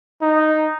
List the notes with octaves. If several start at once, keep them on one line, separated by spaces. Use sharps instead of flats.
D#4